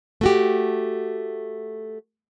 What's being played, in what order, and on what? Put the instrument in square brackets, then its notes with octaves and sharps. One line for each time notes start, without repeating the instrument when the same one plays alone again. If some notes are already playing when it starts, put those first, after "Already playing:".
[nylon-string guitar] A3 F#4 G4